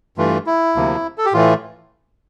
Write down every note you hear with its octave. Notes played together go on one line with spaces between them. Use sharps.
G2 E3 A3 F4
E4
D2 C3 F3 A#3
A4
G4
A2 E3 A3 F4